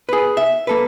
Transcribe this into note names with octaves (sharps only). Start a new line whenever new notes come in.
G#4 B4
E5
A#3 A4 B4